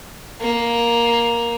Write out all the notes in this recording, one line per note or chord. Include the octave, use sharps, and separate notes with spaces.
A#3